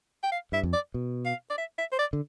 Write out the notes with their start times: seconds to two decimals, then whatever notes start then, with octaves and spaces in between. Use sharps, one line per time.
0.23 G5
0.32 F5
0.52 G2 E5
0.63 F2
0.73 D5
0.94 B2
1.26 F5
1.50 D5
1.58 E5
1.78 E5
1.92 C5
1.99 D5
2.13 D3